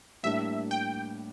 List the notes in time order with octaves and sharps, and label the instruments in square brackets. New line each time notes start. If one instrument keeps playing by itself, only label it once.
[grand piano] A2 G3 A#3 D4 [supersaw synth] E5
[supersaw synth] G5